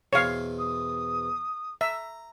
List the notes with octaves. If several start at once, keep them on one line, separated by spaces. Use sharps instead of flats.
E2 B2 C4 C#5 F5
D#6
E5 A#5